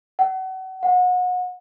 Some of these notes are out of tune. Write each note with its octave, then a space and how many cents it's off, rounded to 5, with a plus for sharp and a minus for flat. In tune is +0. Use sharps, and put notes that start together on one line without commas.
F#5 +35
F#5 -30